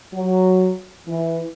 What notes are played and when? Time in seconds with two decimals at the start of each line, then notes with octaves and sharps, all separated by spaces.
0.13 F#3
1.07 E3